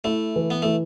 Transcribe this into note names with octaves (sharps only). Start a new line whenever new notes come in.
A3 E4
E3
B3
E3 A3